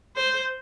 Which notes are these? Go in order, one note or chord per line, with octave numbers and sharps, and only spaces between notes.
C5